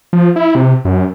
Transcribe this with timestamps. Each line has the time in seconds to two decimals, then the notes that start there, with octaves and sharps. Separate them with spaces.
0.13 F3
0.36 E4
0.55 C3
0.85 F#2